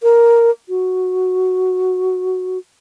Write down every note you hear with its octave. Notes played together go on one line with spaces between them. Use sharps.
A#4
F#4